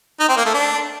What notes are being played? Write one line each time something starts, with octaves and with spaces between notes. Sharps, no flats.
D#4
C4
A#3
A3
D4